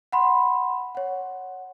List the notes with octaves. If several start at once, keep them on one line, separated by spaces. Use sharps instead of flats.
F#5 B5 C6
C#5 F#5